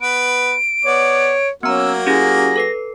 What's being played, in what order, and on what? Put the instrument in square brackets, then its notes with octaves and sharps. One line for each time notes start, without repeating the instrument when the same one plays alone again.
[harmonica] B3 B4 [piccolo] D7
[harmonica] B3 D5 [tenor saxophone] C#5
[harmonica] F#3 A#3 F#4 [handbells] B3 A#5 [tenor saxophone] C#4 [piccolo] E6
[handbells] C#4 E4 G4 [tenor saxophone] G#4 [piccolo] A#6
[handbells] A4 B4 C7